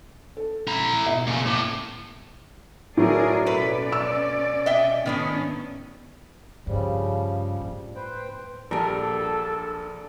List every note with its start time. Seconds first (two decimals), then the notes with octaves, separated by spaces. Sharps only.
0.37 A4
0.68 E4 A#5
1.06 B2 E5 C7
1.27 A#2 C#3
1.46 A2 D6
2.97 A2 F#3 G#4 A#4 D5
3.46 B2 A3 C#4 B4 D5
3.92 E6
4.66 D#5 E5 G5
5.06 A2 D#3 B3 C#4 D4
6.67 G2 C#3 F3 G3
7.61 A2
7.95 B4 C5 G5
8.71 A#1 G3 D4 A4 A#4